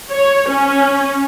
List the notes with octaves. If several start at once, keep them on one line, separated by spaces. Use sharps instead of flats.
C#5
C#4